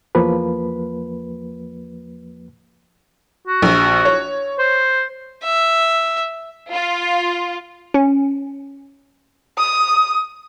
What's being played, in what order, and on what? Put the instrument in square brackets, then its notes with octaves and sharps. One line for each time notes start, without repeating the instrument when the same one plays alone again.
[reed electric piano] E2 F3 A#3 B4
[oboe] F#4
[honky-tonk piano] A#1
C#5
[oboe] C5
[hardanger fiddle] E5
[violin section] F4
[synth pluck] C#4
[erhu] D#6